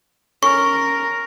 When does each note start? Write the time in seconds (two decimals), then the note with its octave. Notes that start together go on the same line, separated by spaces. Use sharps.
0.43 C#4 A#4 C#6